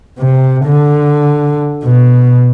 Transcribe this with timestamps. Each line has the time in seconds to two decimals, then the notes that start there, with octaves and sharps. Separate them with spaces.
0.19 C3
0.66 D3
1.84 B2